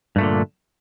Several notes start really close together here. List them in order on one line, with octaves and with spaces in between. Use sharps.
G2 A3 A#2 D3